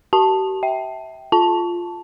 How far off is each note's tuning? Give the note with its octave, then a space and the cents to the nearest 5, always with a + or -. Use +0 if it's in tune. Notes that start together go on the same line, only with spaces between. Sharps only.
G4 -45 A5 +0
E5 -20 G5 -5
F4 +0 A5 +0